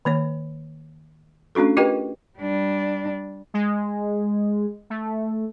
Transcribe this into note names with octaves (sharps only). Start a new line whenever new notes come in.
D#3 A#3 C#5
A3 C#4 D4 F#4 A4
F4 G4 A#4 B4 D#5 G5
G3 D4
G#3
A3